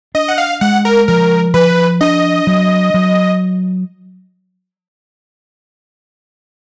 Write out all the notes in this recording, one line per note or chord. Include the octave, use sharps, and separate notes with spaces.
D4 D#5
F#5
F5
G#3 F#5
A#4
F3 A#4
F3 B4
D4 D#5
F#3
F#3